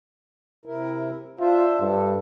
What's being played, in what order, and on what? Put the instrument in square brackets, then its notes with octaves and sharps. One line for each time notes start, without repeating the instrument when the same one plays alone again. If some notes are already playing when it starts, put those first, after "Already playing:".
[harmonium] C3 E4 A#4
[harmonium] D4 C5 E5 [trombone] F4
[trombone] G2 [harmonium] A4